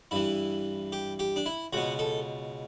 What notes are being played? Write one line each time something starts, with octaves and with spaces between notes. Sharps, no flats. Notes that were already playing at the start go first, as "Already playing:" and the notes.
G2 E3 E4
G4
G4
D4
E4
C#2 B2 F#4
A4